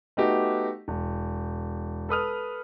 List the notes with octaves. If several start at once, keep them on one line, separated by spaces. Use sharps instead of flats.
A3 B3 D#4 F#4 G4
E1
A4 B4 D#6 F6